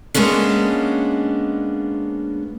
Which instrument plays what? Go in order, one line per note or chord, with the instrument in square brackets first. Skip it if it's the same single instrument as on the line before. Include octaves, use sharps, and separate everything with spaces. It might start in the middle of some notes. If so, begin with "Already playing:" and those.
[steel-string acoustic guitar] G#3 A#3 B3 C#4 D4